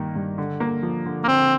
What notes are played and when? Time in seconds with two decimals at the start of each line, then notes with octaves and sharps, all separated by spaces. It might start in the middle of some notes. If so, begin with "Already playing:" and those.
Already playing: G2 D#3 A#3
0.15 G2
0.38 D3
0.60 A#3
0.83 F3
1.06 D3
1.24 A#3
1.28 D3 C4